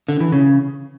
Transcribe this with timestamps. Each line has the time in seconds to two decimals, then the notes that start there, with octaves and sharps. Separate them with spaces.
0.08 D3
0.20 E3
0.32 C#3